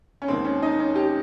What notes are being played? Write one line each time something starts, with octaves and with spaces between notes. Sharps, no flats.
C#4
D#2 D#3 G#3 C4
C#4
D#4
C#4
G4